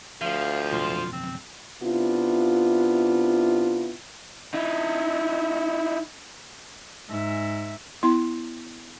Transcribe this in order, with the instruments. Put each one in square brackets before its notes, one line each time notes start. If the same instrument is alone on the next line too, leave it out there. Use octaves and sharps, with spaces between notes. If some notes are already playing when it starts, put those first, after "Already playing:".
[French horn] D2 [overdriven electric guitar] F3 [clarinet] F5
[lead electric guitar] B1 F2 [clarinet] F4
[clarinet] C4
[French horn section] C3 B3 D4 E4 F4
[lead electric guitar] D#4 E4
[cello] G#2 E5
[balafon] B3 E4 C6